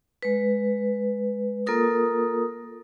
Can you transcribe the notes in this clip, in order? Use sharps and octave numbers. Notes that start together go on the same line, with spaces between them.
G#3 B4
A#3 F4 A4 A#4 D#6